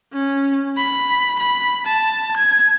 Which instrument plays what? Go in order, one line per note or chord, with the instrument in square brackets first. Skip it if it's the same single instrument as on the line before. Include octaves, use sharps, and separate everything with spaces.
[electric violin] C#4
B5
B5
A5
G#6